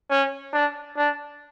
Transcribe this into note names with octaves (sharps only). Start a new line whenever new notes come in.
C#4
D4
D4